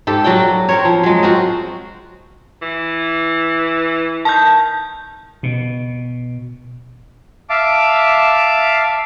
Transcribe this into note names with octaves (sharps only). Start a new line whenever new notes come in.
G#2 G4 A4
F#3 F#4 D5 G5
C4 A#4 C#5
F3
F#3 G#3
C4 F4 F#4
E3
D#3 A5 G6
B2
E5 F5 A5 D6